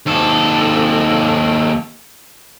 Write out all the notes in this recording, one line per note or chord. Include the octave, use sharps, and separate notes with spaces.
D#2 A4